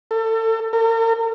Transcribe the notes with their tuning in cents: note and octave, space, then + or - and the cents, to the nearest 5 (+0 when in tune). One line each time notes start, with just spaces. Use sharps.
A4 +30
A#4 -45